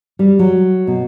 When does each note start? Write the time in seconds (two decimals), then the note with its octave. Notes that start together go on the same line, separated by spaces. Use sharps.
0.19 G3
0.39 F#3
0.87 B2